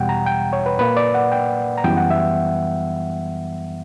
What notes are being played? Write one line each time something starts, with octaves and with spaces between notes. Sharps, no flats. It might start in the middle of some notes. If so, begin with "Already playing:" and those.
Already playing: E2 B2 G3 F#5 G5
A#5
G5
C#5
B4
A#2 A#3 B4
D5
F#5
G5
A#5
F#2 E3 G3 B3 G5
F#5
E5